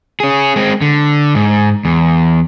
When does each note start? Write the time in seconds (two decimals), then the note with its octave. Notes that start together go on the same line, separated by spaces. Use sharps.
0.20 C#4 G#4
0.56 G#3 C4
0.81 D3
1.35 G#2
1.85 E2